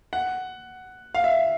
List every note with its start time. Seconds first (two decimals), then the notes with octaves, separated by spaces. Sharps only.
0.13 F#5
1.14 F5
1.24 E5